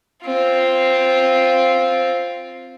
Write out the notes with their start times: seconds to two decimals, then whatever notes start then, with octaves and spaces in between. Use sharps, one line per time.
0.26 C4 F4